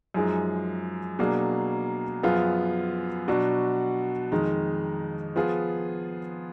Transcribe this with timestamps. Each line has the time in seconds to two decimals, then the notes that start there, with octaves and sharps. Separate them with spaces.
0.14 F#2 F3 G#3 D#4 G#4
1.19 B2 F#3 A#3 D4 G#4
2.23 F#2 F3 B3 F4 G#4
3.28 B2 F#3 D4 F#4
4.32 F2 D#3 G#3 D#4
5.36 F3 B3 F4 G#4